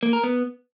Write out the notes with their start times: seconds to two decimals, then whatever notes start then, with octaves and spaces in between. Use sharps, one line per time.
0.03 A#3
0.13 A#4
0.24 B3